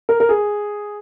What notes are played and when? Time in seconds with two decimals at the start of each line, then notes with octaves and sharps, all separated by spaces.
0.09 A#4
0.20 A#4
0.29 G#4